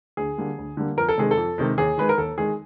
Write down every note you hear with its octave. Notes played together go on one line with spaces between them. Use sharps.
D2 G#4
D3 G3 A#3
D2
D3 G3 A#3
F2 A#4
A4
C3 D#3 G#3 G#4
A4
F2
C3 D#3 G#3
D#2 G#4
D#3 G#3 B4
A#4
D#2 A4
D#3 G#3 G#4